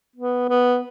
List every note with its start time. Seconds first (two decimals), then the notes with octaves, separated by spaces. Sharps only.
0.16 B3
0.49 B3